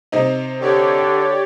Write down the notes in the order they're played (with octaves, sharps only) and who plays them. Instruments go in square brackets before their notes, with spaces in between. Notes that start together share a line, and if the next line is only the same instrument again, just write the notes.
[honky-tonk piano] C3 C4 D#4
[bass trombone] D3 [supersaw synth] G4 C#5 D5